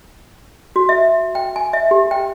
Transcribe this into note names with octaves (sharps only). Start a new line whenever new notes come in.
F#4
E5
G5
G#5
E5
G4
G5